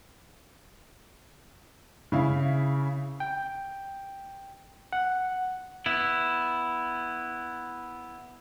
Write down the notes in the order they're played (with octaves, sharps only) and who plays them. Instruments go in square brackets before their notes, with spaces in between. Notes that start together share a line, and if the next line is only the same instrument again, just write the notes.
[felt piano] C#3 E4 F5
[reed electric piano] G5
F#5
[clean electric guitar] B3 E4